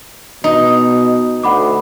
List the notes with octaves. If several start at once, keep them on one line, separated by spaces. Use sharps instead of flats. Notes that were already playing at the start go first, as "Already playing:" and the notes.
B2 D#4
D2 F#5 B5 D6